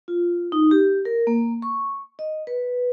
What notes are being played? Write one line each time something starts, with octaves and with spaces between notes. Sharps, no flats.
F4
D#4
G4
A#4
A#3
C#6
D#5
B4